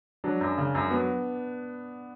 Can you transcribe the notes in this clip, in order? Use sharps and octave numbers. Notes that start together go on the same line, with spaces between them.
F#3 D4
F#2
C#3
F#2
F#3 B3